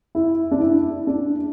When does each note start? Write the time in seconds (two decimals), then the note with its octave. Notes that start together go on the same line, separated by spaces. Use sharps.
0.15 E4
0.51 D4
0.60 E4
1.07 D4